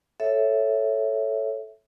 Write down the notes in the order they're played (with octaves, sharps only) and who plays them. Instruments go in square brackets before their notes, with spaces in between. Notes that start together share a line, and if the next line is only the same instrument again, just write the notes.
[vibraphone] A4 C#5 E5